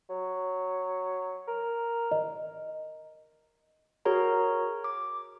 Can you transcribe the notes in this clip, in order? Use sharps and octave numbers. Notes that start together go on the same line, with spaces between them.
F#3
A#4
D#5
F#4 G#4 A#4 C#5 A#5
D6